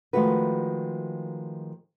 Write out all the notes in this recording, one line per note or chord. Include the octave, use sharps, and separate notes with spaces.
D#3 F3 G#3 A3 F#4 B4